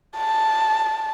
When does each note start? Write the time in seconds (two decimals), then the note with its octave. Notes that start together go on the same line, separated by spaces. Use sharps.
0.17 A5